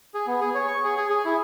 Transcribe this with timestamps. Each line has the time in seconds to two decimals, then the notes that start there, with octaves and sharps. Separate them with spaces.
0.14 G#4
0.27 B3
0.41 G#4
0.55 C#5
0.67 C#6
0.84 G#4
0.97 G#4
1.10 G#4
1.25 E4